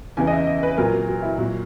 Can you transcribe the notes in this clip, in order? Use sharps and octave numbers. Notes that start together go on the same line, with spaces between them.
E2 C#3 E3 G#5
D#5
E5
D#5
B4
A#2 F#3 A#4
F#4
F#4
E4
A#2 F#3 F#4